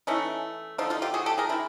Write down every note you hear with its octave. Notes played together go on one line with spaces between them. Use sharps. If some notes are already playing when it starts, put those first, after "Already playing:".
E3 A3 C#4 D#4
D3 F3 A3 D#4 F4
D#4 F4
F4 G4
F#4 G#4
G4 A4
G#4 A#4
D#3 G#3 D4 E4